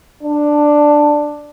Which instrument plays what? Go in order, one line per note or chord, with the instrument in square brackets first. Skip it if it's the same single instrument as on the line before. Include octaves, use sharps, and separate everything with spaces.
[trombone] D4